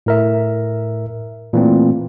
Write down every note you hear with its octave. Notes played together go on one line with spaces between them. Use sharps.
A2 A#4 E5
A#2 E3 A3 C4